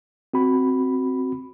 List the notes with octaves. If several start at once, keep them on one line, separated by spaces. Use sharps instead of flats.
C4 F#4 B5